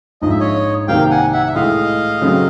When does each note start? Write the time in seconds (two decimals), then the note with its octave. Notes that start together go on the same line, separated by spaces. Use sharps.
0.22 A#1 G#2 F3 D#5
0.30 E5
0.40 C#5 D#5
0.88 C2 C3 D#3 G3 A#3 F5 G5
1.10 F#5 G#5
1.32 E5 F#5
1.46 E5
1.55 A2 E3 G#3 D#5 F5
2.21 F#2 C#3 F#3 A3 C4